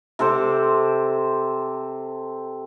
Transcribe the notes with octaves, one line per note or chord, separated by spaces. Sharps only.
C3 A4 C5 D6